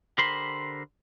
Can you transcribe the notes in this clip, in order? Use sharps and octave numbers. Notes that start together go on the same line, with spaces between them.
D3 G4 A#4 C5 B5 C6